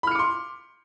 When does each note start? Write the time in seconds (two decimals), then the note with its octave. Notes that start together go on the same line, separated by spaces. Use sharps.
0.03 B5
0.07 F6
0.11 C#7
0.15 D6
0.19 C6